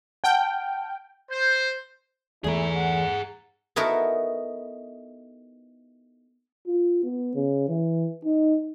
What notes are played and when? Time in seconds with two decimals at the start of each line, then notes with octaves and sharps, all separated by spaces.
0.24 F#5 G5 A5 F6
1.32 C5
2.44 E2 A3 E4 G#4 A#5
2.75 F#5
3.76 B3 D#4 E4 F#4 A4 A#4
6.67 F4
7.04 B3
7.35 C#3
7.68 E3
8.25 D#4